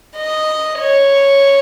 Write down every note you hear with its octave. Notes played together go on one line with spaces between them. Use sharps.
D#5
C#5